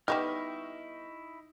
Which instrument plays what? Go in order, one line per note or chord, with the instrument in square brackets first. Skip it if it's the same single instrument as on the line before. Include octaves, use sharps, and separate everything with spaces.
[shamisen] G3 B3 G4 [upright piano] D#4 [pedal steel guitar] E4 C#6 F6